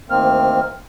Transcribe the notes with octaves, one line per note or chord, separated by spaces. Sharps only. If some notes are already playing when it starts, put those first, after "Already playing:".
D2 D#3 A#3 C4 F6